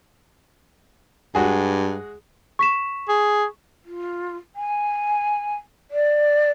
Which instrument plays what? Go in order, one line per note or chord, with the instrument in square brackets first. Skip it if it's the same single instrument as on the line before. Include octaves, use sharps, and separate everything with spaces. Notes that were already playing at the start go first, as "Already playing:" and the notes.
[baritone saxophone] G2 [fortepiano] G#3 F#4 G#4
[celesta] C#6 B6 E7
[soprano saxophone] G#4
[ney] F4
G#5
D5